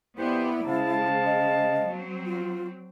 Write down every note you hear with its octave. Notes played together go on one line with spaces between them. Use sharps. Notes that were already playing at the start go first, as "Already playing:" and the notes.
F2 B3 E4 G4 C5 D5
C#3 G#3 C5 F5 A5
D#5
F#3 C4
F4